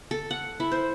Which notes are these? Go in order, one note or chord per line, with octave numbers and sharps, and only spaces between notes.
A4
F#5
E4
C5